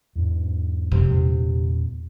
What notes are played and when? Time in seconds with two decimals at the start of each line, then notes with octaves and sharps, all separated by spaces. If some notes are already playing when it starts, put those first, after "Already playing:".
0.15 E2 G#2
0.92 F2 C3 F3 G#3
1.09 E2 A#2